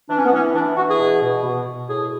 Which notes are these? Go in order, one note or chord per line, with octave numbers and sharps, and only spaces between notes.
E3 D4
C#4
B3
E3 C#4
E3 D4
E3 F#4
G#4
B2
B2
B2
B2
A2 G#4